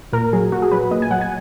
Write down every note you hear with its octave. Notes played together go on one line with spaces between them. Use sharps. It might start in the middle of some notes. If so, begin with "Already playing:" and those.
A#2 A#4
F#3 G#4
A#2 F#4
G#4
F#3 B4
A#2 D#5
G#5
F#3 F#5
G#5